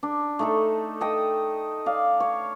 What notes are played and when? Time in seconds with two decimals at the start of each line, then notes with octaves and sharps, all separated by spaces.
0.03 D4
0.39 A3 D#4 A4
1.01 A4 D#5 G5
1.86 D5 F5
2.20 C#5